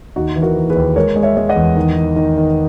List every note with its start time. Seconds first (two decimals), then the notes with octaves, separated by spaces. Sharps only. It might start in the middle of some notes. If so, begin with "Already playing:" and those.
0.16 D#2 D#4 F#4
0.36 E3
0.42 F#4 A#4
0.56 E3
0.70 G#4 B4
0.76 D#2
0.96 G#3 A#4 C#5
1.16 G#3
1.23 C#5 E5
1.37 G#3
1.49 D#5 F#5
1.56 E2
1.76 D#3
1.97 D#3
2.16 D#3
2.37 D#3